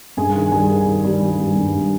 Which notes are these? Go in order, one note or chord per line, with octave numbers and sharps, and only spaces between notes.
G2 G#4 G#5
D#3
G3 G#4 G#5
D#3
D#3
G3
G3
G2
G2
G2